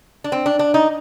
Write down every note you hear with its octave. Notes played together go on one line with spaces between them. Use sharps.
D4
C4
D4
D4
D#4